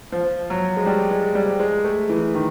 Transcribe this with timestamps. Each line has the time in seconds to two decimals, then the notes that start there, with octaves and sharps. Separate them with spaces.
0.12 F3
0.50 F#3
0.77 G#3
0.86 G3
1.11 G#3
1.35 G3
1.60 G#3
1.84 A3
2.09 E3
2.35 D#3